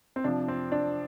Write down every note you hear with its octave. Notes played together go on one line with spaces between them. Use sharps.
C4
C3 F3 D4
C4
D4